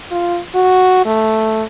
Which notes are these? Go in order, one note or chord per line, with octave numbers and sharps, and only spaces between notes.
F4
F#4
A3